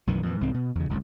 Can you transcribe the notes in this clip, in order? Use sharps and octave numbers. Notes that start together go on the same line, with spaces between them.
B1 F#2 D#3 E3
F2 A#2 E3
C2 G#2 E3 C4
B2
E2 C#3
G1 C#2 F#2